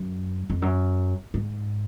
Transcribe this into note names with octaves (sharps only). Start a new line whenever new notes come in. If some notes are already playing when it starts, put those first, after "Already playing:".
Already playing: F#2
F2
F#2
G#2